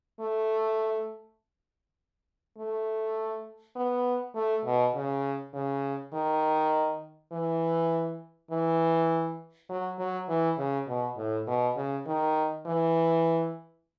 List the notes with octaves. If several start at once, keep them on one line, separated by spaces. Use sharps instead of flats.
A3
A3
B3
A3
B2
C#3
C#3
D#3
E3
E3
F#3
F#3
E3
C#3
B2
A2
B2
C#3
D#3
E3